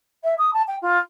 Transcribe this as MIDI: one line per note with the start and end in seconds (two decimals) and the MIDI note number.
0.23 0.34 76
0.38 0.53 87
0.53 0.62 81
0.67 0.76 79
0.81 0.98 65